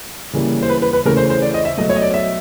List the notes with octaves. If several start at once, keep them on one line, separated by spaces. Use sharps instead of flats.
C#3 E3 G3 A#3
C5
B4
B4
B4
C#3 E3 A3 A#4
C5
C5
D5
D#5
E5
B2 F#3 A3 D#5
C#5
D#5
D5
E5